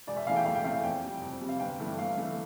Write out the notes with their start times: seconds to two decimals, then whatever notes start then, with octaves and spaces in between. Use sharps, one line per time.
0.07 E1 D5
0.17 E5
0.27 E2 E3 A3 F5
0.36 G5
0.46 E1 F5
0.55 G5
0.64 E2 E3 A3 F5
0.84 F2 G5
1.03 C3 G3 C4
1.21 F2
1.41 C3 G3 C4
1.49 F5
1.60 G1 G5
1.79 G2 E3 A3
1.98 G1 F5
2.17 E3 A3